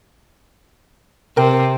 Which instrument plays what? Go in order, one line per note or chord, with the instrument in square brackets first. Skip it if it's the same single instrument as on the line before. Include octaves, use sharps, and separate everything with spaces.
[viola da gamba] C3 [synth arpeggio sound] A#4 G5